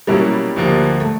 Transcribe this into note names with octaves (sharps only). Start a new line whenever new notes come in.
B2 F#3 G3 A#3 C#4 E4
D2 D3 F3 A#3 D4
A3